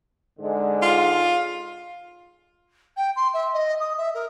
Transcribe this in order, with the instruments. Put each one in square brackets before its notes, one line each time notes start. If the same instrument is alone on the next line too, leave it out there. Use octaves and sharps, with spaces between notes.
[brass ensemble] G#2 D3 G#3
[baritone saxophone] F4
[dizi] G5
C6
E5
D#5
D#6
E5
A#4